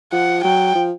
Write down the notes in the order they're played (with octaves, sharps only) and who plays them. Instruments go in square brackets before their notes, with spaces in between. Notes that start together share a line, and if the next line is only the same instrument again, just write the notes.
[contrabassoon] F3 [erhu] F#5
[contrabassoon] F#3 [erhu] G5
[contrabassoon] F3